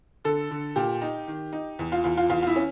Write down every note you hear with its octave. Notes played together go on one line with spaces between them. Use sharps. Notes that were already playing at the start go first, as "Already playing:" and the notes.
D3 A4
D3
A#2 G4
D#4
D#3
D#4
E2
F4
E2 F4
F4
E2 F4
F4
E4
C#4